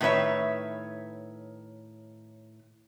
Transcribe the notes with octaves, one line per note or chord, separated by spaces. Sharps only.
A2 D#3 B4 C#5 E5